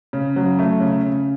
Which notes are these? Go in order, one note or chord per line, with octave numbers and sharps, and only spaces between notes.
C#3
F#3
A3
C#3
C#3